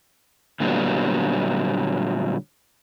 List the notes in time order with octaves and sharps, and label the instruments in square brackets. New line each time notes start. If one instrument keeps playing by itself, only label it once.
[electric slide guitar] A#2 D3 F#3 G3 B3